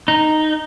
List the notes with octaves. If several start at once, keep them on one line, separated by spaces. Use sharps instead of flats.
D#4